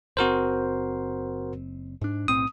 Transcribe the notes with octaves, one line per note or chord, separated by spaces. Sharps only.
F#1 C4 F#4 A#4 C5
G#2 D4
B1 A2 C4 D#6